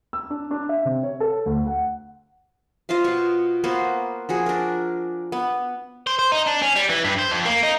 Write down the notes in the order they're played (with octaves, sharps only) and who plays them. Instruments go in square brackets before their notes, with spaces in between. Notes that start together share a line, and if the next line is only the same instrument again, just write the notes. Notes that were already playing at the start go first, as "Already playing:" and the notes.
[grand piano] E6
D4
D4
E5
C3
C#5
A4
D2
F#5
[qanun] F4 C5 D#5 F5
B2 C#6
A#3 B3 F#4 C5
F3 F#4 G#4
D4 A#4
B3
[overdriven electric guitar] C5
C5
D#4
D4
C#4
G3
E3
G2
C5
F2
A#3
D#4